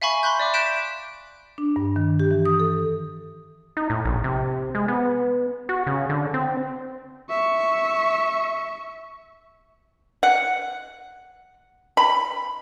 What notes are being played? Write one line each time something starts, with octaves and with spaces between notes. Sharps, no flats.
E5 F5 G#5 B5 C#6
B5 C6 F#6 G6
D5 E5 D6
F#6 G6 B6 D7 E7
D4
G2
D#3
G4
E3
D#6
A4
D#4
A2
A#1
C3
G#3
B3
F#4
C#3
D3
C4
E5 C#6
F#5
B5